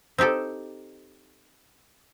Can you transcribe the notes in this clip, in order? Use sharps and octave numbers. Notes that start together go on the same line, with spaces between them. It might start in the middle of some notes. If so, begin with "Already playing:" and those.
C4 D#4 G4 A4